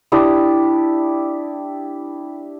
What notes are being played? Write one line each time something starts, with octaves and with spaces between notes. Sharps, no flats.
D4 E4 G4 D#6